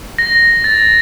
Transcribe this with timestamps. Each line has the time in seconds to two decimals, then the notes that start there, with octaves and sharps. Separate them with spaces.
0.18 A#6
0.64 A6